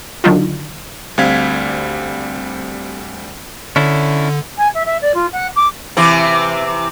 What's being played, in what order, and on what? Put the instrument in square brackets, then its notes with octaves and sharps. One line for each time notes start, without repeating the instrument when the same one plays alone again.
[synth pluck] D3 D#3 F#3 D4 D#4 F4
[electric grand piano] D2 G3 C4 F5 G#6 B6
[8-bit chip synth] D3 [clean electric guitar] C#4 D4 E4
[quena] G#5
E5
E5
D5
F4
F#5
D6
[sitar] C3 E3 C4